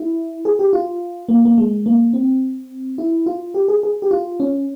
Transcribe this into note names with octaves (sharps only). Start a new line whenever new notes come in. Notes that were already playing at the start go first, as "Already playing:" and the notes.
Already playing: E4
G#4
G4
F4
A#3
A#3
G#3
A#3
C4
E4
F4
G4
G#4
G#4
G4
F4
C#4